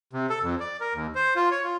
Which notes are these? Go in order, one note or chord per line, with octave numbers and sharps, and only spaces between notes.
C3
A4
F2
D5
A#4
D#2
C5
F4
C#5
F4